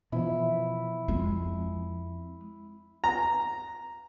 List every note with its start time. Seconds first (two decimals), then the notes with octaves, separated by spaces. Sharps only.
0.12 B2 E3 F3 E4
1.08 F2 G#3
3.04 A#5